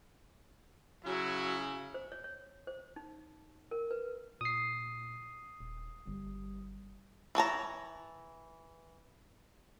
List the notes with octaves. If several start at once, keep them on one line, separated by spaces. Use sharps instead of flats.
C#3 F#3 E4
C5
C#5
C#5
C5
D#4
A#4
B4
A#2 D#6 C7
D#1
G1 G3
E3 C#5 A5 A#5